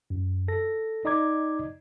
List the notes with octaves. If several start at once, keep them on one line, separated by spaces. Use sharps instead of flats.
F#2
A4 A#6
D#4 D5 D#5 A#5 D6 G#6